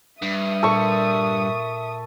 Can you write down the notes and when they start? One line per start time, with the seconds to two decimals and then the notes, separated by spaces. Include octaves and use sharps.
0.22 G2 E5 D#6
0.63 A#2 A4 C6 C#6